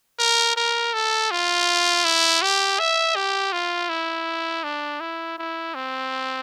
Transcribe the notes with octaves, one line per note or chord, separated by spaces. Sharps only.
A#4
A#4
A4
F4
E4
G4
E5
G4
F4
E4
D4
E4
E4
C4